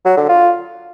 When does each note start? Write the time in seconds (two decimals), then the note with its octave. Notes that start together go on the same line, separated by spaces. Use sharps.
0.05 F#3
0.17 D3
0.29 F4